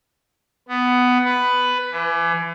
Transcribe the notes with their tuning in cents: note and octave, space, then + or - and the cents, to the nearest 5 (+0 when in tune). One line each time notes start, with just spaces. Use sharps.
B3 +10
B4 +10
E3 +35